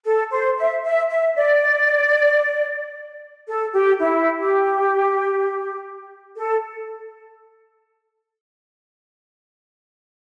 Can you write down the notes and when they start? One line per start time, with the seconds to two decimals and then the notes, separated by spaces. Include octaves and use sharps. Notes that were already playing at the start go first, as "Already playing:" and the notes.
0.05 A4
0.31 C5
0.57 E5
0.83 E5
1.09 E5
1.36 D5
3.48 A4
3.74 G4
4.00 E4
4.39 G4
6.37 A4